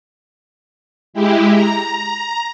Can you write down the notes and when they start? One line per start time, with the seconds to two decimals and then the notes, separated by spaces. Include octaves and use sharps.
1.14 G#3 E4 G4
1.51 A#5